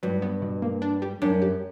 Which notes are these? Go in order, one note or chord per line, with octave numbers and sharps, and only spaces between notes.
G2 F#3
B3
B2
A#3
D4
G3
F#2 D4
G4